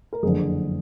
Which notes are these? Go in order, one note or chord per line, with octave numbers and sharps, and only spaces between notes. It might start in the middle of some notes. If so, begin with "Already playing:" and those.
A#4
F#1 F2 D3 G#4